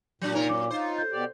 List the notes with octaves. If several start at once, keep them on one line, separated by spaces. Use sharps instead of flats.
A#2 F#3 D4
C3 D#4 A#4 C#5
F#2 D6
D#4 F4 C5
A4 G6
B2 G4 D5